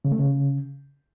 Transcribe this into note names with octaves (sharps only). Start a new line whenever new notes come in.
C#3
A3
C#3